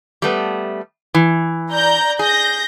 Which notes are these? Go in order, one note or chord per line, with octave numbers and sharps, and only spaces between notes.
G3 A3 B3
E3
D5 A#5 G6
G#4 G6 A#6